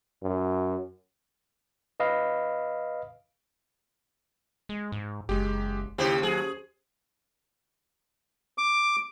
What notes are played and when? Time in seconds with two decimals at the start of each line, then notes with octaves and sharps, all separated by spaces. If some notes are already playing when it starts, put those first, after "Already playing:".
0.23 F#2
2.00 B4 D#5 F5 B5
4.69 G#3
4.92 G#2
5.29 F#1 G#3 G4
5.98 D#2 C#3 E4 G4 C5
6.23 F#3 G#4
8.58 D6